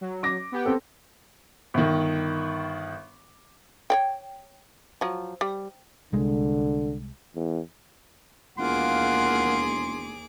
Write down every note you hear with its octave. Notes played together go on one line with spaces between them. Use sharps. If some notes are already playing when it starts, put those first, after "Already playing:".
F#3
D6 A#6
B3 G4 G5
C4 A4
G1 D#3
C#5 D5 G5
F3 F#3
G3
C2 D3 G#3
E2
E1 D#2 A#3 F4 G#4 F#5 C6 D6